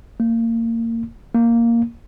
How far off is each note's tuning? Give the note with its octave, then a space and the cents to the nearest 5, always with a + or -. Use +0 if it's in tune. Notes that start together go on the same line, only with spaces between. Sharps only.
A#3 -30
A#3 -5